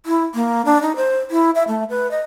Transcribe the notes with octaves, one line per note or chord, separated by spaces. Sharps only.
E4
A#3
D4
D#4
C5
E4
E5
A3
B4
D#5